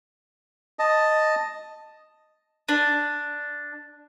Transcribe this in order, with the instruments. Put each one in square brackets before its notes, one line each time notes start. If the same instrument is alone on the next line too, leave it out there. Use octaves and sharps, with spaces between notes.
[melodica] D#5 A5
[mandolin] D4